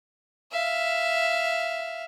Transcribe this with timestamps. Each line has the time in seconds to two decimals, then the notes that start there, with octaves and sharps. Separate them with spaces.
0.52 E5 F5